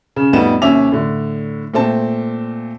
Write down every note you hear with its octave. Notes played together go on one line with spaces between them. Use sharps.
C#3
F2 A2 G3 B3 D#4 E7
D#2 C3 C#4 E5 D6 F7
A2 D3
A#2 A3 C4 A5